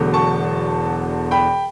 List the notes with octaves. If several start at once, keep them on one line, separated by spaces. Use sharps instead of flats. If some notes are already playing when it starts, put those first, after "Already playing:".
Already playing: E1 E2 D3 F#3 A3
A5 C#6
G5 B5